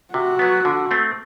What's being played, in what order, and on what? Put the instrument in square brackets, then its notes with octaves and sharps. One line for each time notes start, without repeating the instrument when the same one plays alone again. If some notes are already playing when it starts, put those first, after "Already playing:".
[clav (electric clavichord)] C3 [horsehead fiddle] F#4
[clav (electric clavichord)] F#3 B3
D3
A3 C4